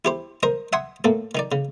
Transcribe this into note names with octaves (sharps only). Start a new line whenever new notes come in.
E4 G4 C5
A#4 C5 D#5
E5 F#5 G#5 C6 D#6
A2 A#3 A4
D#3 D#4 D5
C#3